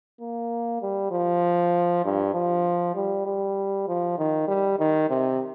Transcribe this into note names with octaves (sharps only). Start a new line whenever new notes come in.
A#3
G3
F3
G2
F3
G3
G3
F3
D#3
G3
D#3
C3